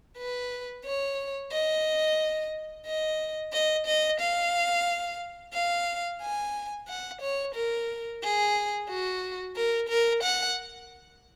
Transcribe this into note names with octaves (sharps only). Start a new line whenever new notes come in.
B4
C#5
D#5
D#5
D#5
D#5
F5
F5
G#5
F#5
C#5
A#4
G#4
F#4
A#4
A#4
F#5